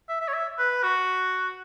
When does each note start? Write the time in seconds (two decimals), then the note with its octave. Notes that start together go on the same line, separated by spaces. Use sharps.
0.09 E5
0.21 E5
0.28 C#5
0.34 E5
0.58 B4
0.83 F#4